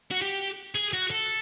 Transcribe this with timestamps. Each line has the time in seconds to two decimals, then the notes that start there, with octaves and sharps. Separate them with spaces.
0.11 F#4
0.22 G4
0.75 G#4
0.93 F#4
1.11 A4